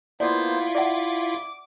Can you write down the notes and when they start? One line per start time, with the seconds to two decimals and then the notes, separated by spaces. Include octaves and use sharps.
0.20 A#3 B3 E4 F4 C5 D5
0.75 D5 E5 F#5 D6